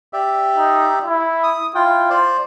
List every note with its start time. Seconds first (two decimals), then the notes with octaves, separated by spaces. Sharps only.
0.13 G4 D5 E5
0.58 D#4
1.05 E4
1.43 D#6
1.75 E4 F4 G5
2.10 C5 D5